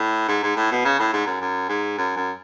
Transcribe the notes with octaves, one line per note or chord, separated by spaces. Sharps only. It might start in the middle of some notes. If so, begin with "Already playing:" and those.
Already playing: A2
G#2
G#2
A2
B2
C#3
A2
G#2
F#2
F#2
G#2
F#2
F#2